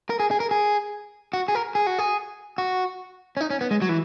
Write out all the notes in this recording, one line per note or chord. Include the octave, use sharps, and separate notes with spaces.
A#4
G#4
G#4
A#4
G#4
F#4
G#4
A#4
G#4
F#4
G#4
F#4
C#4
D#4
C#4
B3
G#3
F#3
E3